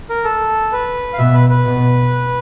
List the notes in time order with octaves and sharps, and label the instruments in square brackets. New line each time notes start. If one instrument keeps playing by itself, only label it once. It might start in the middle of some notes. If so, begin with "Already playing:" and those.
[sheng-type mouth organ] A#4
A4
B4
F5
[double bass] B2 [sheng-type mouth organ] E5
[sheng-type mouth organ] B4
B4
[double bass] B2